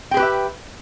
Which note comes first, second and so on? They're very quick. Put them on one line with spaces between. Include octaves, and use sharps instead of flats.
G5 G#4 B4 G4 E5